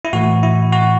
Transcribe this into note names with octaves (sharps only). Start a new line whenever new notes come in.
E4
A2 E3 A3 F#4
E4
F#4